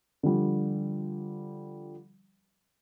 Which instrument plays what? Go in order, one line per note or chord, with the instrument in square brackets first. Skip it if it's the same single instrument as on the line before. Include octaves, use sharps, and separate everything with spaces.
[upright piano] D3 F3 G3